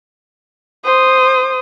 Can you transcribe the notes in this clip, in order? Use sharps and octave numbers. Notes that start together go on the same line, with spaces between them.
C5 D#6